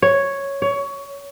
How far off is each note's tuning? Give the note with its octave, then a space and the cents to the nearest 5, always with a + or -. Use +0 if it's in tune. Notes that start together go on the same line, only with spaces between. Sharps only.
C#5 +0
C#5 +20